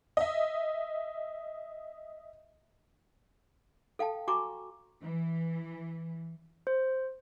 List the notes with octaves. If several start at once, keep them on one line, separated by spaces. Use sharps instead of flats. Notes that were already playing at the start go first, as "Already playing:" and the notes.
D#5 E5
A4 F5 G5 A5
F#4 G#5 A#5 C#6 D6
E3
C5